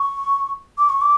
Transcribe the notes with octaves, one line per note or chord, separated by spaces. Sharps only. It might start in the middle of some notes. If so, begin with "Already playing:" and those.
Already playing: C#6
D6
C#6
D6